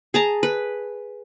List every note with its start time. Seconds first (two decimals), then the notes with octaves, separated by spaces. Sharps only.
0.14 G#4 A5 A#5
0.43 B4